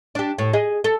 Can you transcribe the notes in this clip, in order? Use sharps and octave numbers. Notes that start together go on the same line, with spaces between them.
D4 G4
A2
G#4 D#5
A4